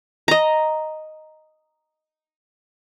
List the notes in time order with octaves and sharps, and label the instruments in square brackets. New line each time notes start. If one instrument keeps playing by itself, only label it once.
[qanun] D#5 A#5